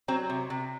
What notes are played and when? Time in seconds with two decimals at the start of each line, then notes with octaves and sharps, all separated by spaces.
0.08 F#3 C4
0.30 C3
0.50 C3